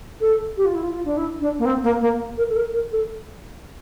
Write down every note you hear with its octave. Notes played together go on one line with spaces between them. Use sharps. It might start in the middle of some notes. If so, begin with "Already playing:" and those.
A4
G4
F4
E4
F4
F4
D4
E4
D4
A#3
C4
A#3
A#3
A#4
A4
A#4
A#4
A4